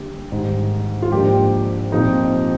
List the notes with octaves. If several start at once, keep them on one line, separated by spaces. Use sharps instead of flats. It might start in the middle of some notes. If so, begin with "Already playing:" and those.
Already playing: D3 G3 A#3 D4 G4
G#2 D#3 G3
F4
G#2 F3 A#3 D4 G4
A#2 F3 C4 D#4